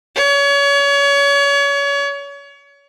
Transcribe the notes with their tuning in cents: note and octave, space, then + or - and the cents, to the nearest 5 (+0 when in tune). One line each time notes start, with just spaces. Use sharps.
C#5 +30